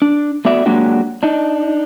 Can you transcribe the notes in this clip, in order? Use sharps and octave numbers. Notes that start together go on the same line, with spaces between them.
D4
A3 B3 F#4 D5 E5
F#3 G#3 A#3 D4 F#4 G4
D4 D#4